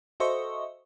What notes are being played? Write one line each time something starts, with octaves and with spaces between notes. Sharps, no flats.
F#4 A4 C5 D#5 E5 C#6